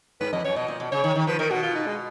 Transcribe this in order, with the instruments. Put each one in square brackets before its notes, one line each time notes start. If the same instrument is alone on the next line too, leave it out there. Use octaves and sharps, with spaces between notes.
[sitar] G#2 [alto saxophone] B4
[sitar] F2 [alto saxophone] D#5
[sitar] F#2 [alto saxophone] C#5
[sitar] B2 [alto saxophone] D#5
[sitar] A#2
B2
[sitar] C#3 [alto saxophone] C#5
[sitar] D#3
D#3
[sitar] F3 [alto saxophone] B4
[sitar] D#3 [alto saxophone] A#4
[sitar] B2 [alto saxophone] F#4
[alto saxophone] F4
D#4
G#3